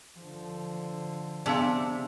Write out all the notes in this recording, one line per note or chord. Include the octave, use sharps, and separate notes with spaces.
D3 F3
C3 B3 D4 G#4 F5